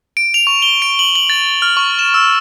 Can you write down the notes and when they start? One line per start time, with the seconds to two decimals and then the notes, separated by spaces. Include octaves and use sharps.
0.17 D7
0.34 F7
0.47 C#6
0.62 G7
0.82 D7
0.99 F#7
1.16 F#7
1.30 A6
1.62 F6
1.77 C#6
1.99 E7
2.14 E6